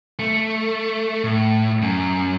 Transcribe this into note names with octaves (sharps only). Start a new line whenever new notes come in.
A3
A2
F#2